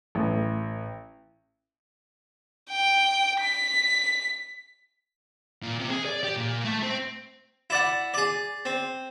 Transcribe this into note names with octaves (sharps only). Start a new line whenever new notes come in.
A1
G5
B6
A#2
C3
G#4
D5
G4
A#2
A3
C4
E4 D5 F#5
G#4 D5
C4